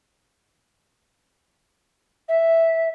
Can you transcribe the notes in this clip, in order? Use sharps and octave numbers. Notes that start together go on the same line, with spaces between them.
E5